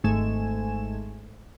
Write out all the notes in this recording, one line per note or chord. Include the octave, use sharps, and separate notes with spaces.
G#1 G#2 A3 G#5 E7